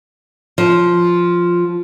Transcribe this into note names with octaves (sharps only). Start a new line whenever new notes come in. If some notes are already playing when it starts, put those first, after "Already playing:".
F3